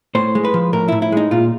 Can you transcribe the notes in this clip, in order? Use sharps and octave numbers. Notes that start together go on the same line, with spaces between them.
A2 C5
G#3
B4
F3
A2 A#4
A2 E4
E4
G#3 D#4
A#2 F4